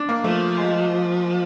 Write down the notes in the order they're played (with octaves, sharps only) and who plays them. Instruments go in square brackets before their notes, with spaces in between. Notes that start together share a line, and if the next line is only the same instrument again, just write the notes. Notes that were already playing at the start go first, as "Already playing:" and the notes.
Already playing: [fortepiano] D4
A#3
[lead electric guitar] F3 [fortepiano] A3
[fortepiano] G#3